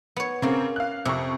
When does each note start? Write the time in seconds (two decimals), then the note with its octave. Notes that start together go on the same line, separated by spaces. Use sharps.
0.16 B3 C#5
0.42 C#3 A#3 C4 C#4
0.76 F5 F#6
1.05 F2 C3 C#6